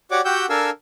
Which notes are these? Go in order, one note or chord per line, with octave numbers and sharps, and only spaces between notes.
F#4 G4 C#5 D5 F#5 D6
F#4 G4 F#5 G5 E6 G6
D4 A4 A#4 F5 G#5 E6